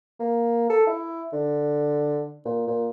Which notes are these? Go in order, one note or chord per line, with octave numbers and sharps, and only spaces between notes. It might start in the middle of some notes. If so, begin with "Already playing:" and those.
A#3
A4
E4
D3
A#2
A#2